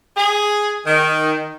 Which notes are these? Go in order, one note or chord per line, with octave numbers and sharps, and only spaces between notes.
G#4
D#3